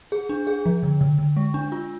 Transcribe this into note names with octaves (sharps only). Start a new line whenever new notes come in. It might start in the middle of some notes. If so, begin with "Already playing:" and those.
G#4
D4
G#4
F3
D3
D3
D3
G#3
D4
F4